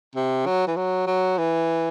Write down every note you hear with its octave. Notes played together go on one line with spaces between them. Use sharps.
C3
F#3
E3
F#3
F#3
E3